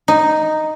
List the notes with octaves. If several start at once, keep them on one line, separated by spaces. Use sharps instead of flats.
D#4